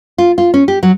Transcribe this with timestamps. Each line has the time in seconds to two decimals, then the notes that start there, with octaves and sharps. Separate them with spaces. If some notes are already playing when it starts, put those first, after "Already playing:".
0.18 F4
0.38 F4
0.54 C#4
0.68 G4
0.83 F#3